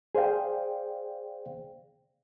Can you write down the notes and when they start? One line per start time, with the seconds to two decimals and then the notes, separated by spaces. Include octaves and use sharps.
0.15 G#4 C5 D5 F5 G5